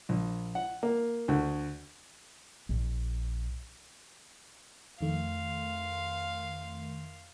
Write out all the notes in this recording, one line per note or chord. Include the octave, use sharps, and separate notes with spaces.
A#1
F#5
A#3
D2
A#1
F2 D#3 A3 F5 C6